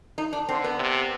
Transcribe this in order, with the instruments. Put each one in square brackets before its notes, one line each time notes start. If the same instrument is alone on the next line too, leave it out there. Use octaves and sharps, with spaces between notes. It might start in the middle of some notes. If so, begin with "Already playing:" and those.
[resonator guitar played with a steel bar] D#4
D4
[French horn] D3 [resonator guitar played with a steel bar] C4
[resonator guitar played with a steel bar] B3
[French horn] C3